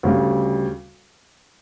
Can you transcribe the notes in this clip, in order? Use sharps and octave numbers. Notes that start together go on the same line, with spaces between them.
D2 C#3 G3